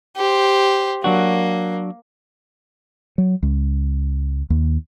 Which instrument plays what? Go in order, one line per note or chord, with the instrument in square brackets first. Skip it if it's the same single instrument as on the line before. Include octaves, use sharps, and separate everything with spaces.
[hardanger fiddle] G4 C5
[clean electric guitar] F#3 D4 F#4 [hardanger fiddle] A#3
[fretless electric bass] F#3
C#2
D#2